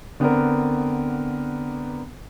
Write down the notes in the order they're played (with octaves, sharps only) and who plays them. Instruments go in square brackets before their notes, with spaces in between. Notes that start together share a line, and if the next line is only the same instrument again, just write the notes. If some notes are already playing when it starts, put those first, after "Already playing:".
[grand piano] D3 B3 C4 D4 A#4